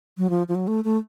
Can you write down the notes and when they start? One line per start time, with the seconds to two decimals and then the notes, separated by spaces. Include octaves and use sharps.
0.18 F#3
0.30 F3
0.48 F3
0.55 F#3
0.67 A3
0.84 A3